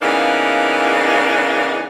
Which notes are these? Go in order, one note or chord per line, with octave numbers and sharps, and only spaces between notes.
C#3 E3 A#3 B3 D4 D#4